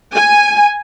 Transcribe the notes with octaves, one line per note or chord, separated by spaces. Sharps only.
G#5